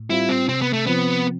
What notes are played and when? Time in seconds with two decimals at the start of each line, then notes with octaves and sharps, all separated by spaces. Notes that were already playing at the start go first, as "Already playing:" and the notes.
Already playing: A2
0.10 G3 C4 E4 F4
0.29 C4
0.49 C3 C4
0.62 B3
0.73 A3
0.87 F3 B3 C4